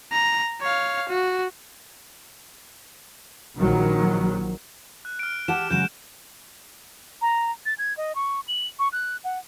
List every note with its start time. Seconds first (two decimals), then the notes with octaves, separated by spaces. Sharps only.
0.12 A#5
0.61 C#5 F5
1.09 F#4
3.57 A#1 D#3 F#3
5.05 F#6
5.19 F6 D7
5.48 G4 F#5 A5 E7
5.70 C#3 F#3 G#3 G6 E7
7.21 A#5
7.66 A6
7.78 G#6
7.97 D#5
8.15 C#6
8.48 F#7
8.79 C#6
8.92 F#6
9.24 F#5